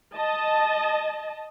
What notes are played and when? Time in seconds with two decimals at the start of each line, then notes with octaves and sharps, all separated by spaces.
0.14 D#5 A5